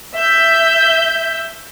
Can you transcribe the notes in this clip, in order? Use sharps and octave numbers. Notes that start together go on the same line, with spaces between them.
E5 G6